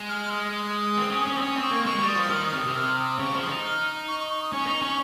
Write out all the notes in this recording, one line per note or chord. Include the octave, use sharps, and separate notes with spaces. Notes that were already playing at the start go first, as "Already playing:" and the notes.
Already playing: G#3
F6
D#6
D#6
C4
C#4
C#4
C#6
C4
C#4 D#6
C4
C#6
A#3
G#3 C#6
G#3
G3
D#6
F3
D#3 F6
D#6
C3
D#6
C3
F6
D#6
C#3 C#6
F3
D#6
D#4
F6
C#6
C#6
C#6
D#6
C#4 C#6
D#4
C#4